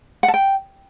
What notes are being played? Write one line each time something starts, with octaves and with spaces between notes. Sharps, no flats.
F#5
A5
G5